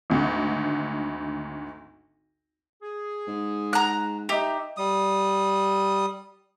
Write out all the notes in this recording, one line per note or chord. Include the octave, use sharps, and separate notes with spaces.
G#1 D2 D3
G#4
G#2
F#5 A#5 F#6
D#4 G4 D#5 E5
G3 D#6